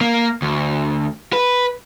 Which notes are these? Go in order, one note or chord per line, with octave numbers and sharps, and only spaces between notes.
A#3
D2
B4